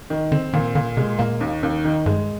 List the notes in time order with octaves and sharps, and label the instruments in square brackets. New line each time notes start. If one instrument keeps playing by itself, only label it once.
[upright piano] D#3
[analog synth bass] D3 [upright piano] C4
[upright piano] A#2 [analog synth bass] D#3
[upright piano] A#2 [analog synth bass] D3
[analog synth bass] C3 [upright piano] G#3
[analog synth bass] A#2 [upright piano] A#3
[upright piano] D#2
D#2
D#3
[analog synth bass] G2 [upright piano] G#3